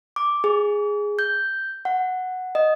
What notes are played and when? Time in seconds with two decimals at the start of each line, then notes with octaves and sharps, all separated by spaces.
0.16 D6
0.44 G#4
1.19 G6
1.85 F#5
2.55 D#5